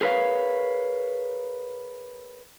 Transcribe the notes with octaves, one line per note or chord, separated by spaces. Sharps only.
G#4 A#4 B4 C#5 F5